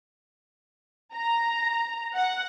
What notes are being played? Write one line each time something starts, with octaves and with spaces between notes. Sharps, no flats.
A#5
F#5